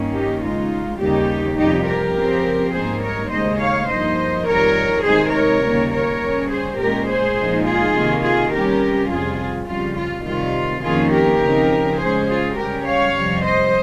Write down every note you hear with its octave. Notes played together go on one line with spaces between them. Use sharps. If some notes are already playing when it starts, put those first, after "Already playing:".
Already playing: G2 D#3 A#3 C#4
D#4 G4
C#3 G#3 D#4 F4
D#2 C#3 G3 A#3 D#4 G4
F2 C3 G3 D#4 G4
G4 A#4
C#3 F3 C4
G#2 G3 A#3 D#4 G#4 C5
A#4 C#5
D#2 C#3 G#3 D#4 C5 D#5
C#5 F5
G2 F3 A#3 D#4 C5 D#5
F2 D#3 G3 A#4 C#5
C3 D#3 G#3 D#4 G#4 C5
A#4 C#5
D#2 C#3 G3 A#3
A#4 C#5
C#3 G3 C#4
G#4 C5
A#2 G#3 C#4 G4 A#4
G#4 C5
A#2 F3 G#3 D#4
F4 G#4
C3 D#3 A#3
F4 G#4
C3 G3 C#4 G4 A#4
F2 C3 G3 F4 G#4
F2 C#3 G3 F4
F4
C3 D#3 G3 F4
F2 D#3 A#3 C#4 F4 G#4
G4 A#4
C#3 F3 C4 D#4
C#3 G#3 C#4 G#4 C5
F4 G#4
C#3 G3 C#4 G4 A#4
C#5 F5
F2 C3 G3
C5 D#5